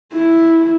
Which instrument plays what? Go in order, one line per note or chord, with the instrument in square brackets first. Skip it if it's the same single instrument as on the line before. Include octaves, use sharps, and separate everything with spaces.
[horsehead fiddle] E4